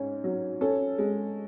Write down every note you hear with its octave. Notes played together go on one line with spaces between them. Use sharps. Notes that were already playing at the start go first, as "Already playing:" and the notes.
Already playing: G#2 C#4
F#3
C#4 A4
G#3